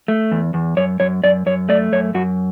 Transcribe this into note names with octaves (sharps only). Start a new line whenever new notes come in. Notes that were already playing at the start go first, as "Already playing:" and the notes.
A3
E2
E2
F#2 C#5
F#2 C#5
F#2 D5
F#2 C#5
A3 D5
F#2 C#5
F#2 F#4